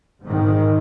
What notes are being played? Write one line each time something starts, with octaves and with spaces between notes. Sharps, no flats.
G#2 D#3